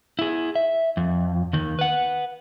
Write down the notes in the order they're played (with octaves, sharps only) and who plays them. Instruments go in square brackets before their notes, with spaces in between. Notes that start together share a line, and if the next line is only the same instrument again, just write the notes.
[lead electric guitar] E4 G#4
E5
F2
D#2 D#3
B4 F#5